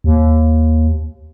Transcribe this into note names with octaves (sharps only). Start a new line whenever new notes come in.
D#2